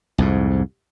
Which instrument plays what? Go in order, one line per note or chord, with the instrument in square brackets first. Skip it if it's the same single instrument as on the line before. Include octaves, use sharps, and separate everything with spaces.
[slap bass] C2 F2 G#2